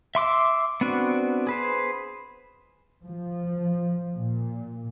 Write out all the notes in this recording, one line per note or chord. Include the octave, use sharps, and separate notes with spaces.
E5 C6 D6 E6
B3 C4 D4 F#4
G#4 B4 C5
F3
A#2